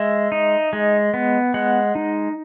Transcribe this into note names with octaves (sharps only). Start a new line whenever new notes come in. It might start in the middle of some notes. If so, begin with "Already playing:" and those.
Already playing: G#3 E5
D#4
G#3
B3
G#3 F#5
D#4